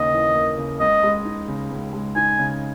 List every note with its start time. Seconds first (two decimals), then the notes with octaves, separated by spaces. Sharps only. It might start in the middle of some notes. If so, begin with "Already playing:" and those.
Already playing: D#2 C#3 A#3 D#5
0.12 E3
0.35 A#3
0.58 C#3
0.80 C#2 D#5
1.03 G#3
1.25 D#4
1.48 C#3
1.71 C#2
1.93 G#3
2.16 D#4 G#5
2.39 C#3